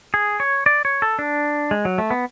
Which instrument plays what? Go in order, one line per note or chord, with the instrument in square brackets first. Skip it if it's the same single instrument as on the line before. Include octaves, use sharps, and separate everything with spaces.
[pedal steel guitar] G#4
C#5
D5
C#5
A4
D4
G#3
F#3
A3
B3